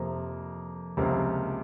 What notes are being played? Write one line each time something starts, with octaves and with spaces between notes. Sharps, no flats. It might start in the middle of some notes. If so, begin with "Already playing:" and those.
Already playing: F2 C3 F3 A#3
C#2 C3 F3 A#3